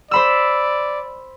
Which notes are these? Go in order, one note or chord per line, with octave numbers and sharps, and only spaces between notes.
C5 D5 B5 E6